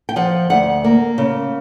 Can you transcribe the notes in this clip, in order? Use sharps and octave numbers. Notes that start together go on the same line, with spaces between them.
G5
F3 F#5
D2 F#5
A#3
C#3